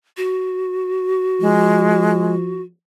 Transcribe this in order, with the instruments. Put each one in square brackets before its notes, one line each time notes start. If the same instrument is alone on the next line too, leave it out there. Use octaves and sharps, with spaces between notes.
[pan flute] F#4
[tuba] F3 [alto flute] G#3